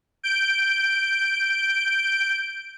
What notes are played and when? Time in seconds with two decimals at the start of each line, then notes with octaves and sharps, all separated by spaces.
0.23 G6 D7